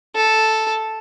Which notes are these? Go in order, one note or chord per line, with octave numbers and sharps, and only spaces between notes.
A4